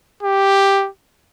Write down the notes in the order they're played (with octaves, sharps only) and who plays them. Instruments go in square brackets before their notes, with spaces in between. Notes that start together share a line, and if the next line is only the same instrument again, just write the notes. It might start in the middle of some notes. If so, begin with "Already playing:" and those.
[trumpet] G4